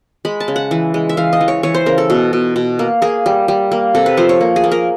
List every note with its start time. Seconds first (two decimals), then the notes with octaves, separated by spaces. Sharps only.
0.25 G#3 B5
0.40 A5
0.48 C#3
0.56 F#5
0.71 E3
0.94 G#3
1.09 E5
1.17 E3 F5
1.33 D#5
1.41 E3
1.48 C#5
1.63 E3 C#5
1.74 C5
1.86 C#3 A#4
1.98 A4
2.10 B2
2.33 B2
2.56 B2
2.79 A#3
3.02 A#3 G#4
3.26 G3
3.48 G3
3.71 A#3
3.95 C3 A4
4.06 B4
4.17 F3 C5
4.29 C#5
4.41 A#3
4.56 G#4
4.64 A#3
4.71 A#4